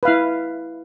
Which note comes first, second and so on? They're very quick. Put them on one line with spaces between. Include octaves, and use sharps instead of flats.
B4 F5 E4